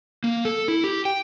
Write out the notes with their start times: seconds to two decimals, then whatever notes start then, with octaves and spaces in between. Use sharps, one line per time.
0.24 A#3
0.45 A4
0.68 E4
0.84 G4
1.05 G5